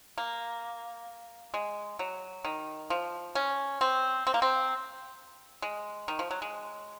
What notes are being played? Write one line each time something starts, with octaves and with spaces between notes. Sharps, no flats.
A#3
G#3
F#3
D#3
F3
C#4
C4
C4
A#3
C4
G#3
D#3
F3
F#3
G#3